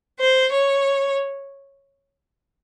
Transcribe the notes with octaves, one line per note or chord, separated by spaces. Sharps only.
C5
C#5